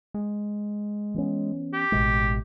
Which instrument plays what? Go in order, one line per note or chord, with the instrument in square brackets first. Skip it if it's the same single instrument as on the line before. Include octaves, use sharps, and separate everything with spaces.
[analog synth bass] G#3
[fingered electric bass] E3 B3 C#4
[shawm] G4
[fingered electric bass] A1 B2 G#3